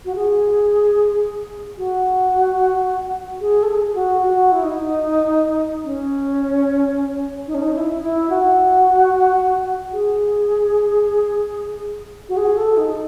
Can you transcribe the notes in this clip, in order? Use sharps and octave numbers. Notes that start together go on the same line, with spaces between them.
F#4
G#4
F#4
G#4
A4
G#4
F#4
F#4
E4
D#4
C#4
D#4
C#4
D#4
E4
E4
F#4
G#4
F#4
G#4
A4
D#4